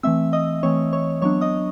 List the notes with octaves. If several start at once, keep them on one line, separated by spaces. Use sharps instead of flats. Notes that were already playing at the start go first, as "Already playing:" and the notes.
E3 A3 C4 E5 E6
D#5 D#6
E3 A3 C4 C#5 C#6
C#5 C#6
F#3 B3 D4 C#5 C#6
D#5 D#6